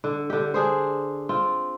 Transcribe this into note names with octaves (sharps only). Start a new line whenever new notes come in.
D3
D3 G4
D4 G#4 C5
C4 F4